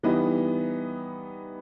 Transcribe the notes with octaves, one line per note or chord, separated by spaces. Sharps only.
E3 G3 B3 D#4